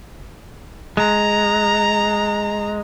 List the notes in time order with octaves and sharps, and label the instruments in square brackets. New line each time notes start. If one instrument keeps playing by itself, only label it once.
[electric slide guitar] G#3 [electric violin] A#5